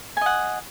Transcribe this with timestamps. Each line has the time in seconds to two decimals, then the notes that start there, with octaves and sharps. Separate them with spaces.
0.17 G#5
0.21 D#5
0.26 F#5